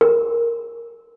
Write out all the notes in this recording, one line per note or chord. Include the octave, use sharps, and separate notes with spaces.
A#4